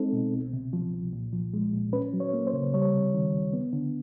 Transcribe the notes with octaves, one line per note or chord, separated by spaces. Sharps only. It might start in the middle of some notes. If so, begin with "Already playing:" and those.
Already playing: G#3 C4 D#4 A4
B2
C2
C3
F3
C2
A#2
F3
G#3
A#2
C#4 B4
F#3
C#5
A#3
C5
C#3
G3 C#5
C3
D#3
C#2
B3
D3